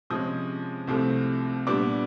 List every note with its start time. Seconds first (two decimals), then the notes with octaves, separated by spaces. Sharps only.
0.10 C3 F3 G#3 C#4 D#6
0.87 C2 C3 F3 A3 C4
1.67 A#2 G3 B3 D4 D6